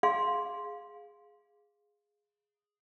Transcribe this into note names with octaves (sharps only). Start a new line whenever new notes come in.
G#4 F5 C6